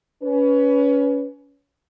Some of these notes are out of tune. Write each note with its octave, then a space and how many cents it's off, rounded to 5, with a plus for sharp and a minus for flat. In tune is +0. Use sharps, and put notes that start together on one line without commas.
C#4 +25 B4 +0